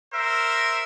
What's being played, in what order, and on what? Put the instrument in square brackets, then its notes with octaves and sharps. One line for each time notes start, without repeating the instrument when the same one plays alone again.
[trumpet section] A#4 C5 E5